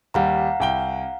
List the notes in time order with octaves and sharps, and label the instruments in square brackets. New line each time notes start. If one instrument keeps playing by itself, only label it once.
[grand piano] D#2 G3 [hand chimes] F5 F#5 A#5
[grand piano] C2 G5 G7